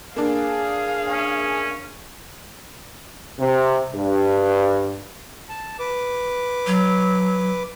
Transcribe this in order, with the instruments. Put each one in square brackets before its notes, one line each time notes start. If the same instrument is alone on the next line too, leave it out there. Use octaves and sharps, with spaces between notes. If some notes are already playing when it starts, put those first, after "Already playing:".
[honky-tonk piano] A#3 D4 [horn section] G#4 [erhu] F5
[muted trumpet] C#4
[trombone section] C3
G2
[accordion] A5
B4 D6
[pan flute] F#3